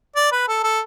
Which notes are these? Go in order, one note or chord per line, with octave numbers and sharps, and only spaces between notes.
D5
B4
A4
A4